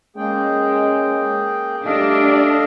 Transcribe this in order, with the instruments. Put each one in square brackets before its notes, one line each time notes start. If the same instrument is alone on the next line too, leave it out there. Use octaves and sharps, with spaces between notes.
[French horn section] G#3 C#4 [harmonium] A#3 G#4 G5
[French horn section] G3 A3 G4 [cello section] D4 [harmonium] A4 D#5 F5